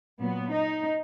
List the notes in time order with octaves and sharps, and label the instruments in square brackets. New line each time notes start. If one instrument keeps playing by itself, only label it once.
[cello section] A#2 F#3 B3
D#4